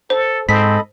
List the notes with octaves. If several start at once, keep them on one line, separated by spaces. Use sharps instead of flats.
A4 C5
G#2 C4 A4 D#5 B5 B6